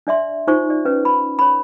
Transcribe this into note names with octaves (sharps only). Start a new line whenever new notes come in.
D4 D5 E5 C6
D#4 F4 C5 C#6
D5
C#4 B4
B5
C#5 B5